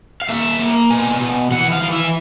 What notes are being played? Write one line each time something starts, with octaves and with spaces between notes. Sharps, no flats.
F5
A#3 E5
A#3
B2 G#5
B2
E3 F#5
F5
E3
E5